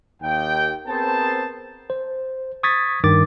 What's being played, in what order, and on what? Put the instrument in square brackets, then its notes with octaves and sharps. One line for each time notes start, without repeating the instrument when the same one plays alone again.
[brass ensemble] D#2 G5
B3 C4 G#4 A#4 C5 A5
[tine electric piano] C5
C#6 D#6 G#6 A6 B6
G2 D#3 D6 A6